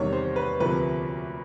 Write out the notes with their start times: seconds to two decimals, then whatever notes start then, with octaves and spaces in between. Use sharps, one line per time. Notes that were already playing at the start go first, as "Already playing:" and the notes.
Already playing: E2 C3 D#3 G3 C#5
0.13 C5
0.36 B4
0.60 D2 C3 F3 A#3 B4